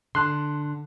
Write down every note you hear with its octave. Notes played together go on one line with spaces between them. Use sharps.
D3 A5 C6 F#6